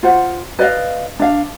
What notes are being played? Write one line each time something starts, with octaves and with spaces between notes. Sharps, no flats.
F4 C5 F#5
B4 D5 D#5 F5
D4 F5